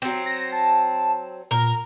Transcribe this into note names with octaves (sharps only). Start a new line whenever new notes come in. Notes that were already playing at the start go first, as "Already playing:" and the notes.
F#3 C4
A#6
A5
A#2 A#4